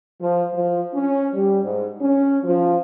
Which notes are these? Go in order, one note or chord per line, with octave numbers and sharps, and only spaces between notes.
F3
F3
C#4
G3
G#2
C#4
F3